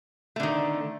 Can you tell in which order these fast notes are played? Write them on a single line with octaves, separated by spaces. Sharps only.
A3 D3 D#3